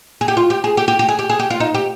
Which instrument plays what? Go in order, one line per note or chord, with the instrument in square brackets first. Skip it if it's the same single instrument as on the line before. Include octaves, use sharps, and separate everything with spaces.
[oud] G#4
G4
F4
G4
G#4
G4
G4
G4
G#4
G4
G#4
G4
F4
D#4
G4